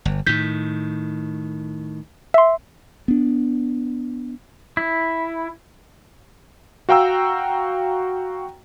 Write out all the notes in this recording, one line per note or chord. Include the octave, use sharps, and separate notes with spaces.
G1
A2 D#3 G6 B6
E5 C6
B3 D4
E4
F#4 F5 G5 A#5 E6